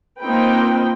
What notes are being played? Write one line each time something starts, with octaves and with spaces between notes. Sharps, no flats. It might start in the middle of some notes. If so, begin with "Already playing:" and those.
A#3 C4 D#4 F4 B4 G5